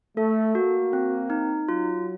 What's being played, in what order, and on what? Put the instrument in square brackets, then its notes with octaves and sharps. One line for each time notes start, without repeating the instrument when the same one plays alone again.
[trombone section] A3 [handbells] A4
[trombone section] A#3 [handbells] F#4
[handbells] C4
D#4
[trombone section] F#3 [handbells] F4